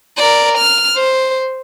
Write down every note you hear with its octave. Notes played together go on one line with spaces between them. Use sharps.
A#4 D5
F6
C5